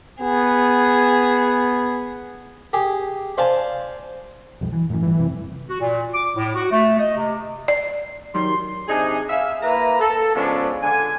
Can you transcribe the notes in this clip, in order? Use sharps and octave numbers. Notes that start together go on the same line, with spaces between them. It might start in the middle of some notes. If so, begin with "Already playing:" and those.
B3 G#4
G4 G#4
C5 D5 F5 G#5 A5
B1 F2 G3
E3
F#2 A2 E3
G1 E3 G3
F#1 C3
F#4
A#2
D6
A2
F#4
A3
D#5
C3
D5
D#3 F#3 G3 C6
C3 D4 D#4 G#4
G#4 E5 F5
A#3 E4 B4 A#5
A4
C#3 F3 G#3 B3 C#4 D4
D3 G#5